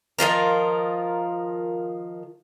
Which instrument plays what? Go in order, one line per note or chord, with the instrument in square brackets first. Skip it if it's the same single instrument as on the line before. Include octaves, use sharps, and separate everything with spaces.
[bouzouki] D#3 F3 F4 A#4